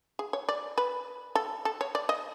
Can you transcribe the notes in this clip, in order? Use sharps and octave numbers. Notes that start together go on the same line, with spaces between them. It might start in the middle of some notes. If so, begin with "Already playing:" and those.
G#4
C#5
D5
B4
A4
A4
C#5
D5
D#5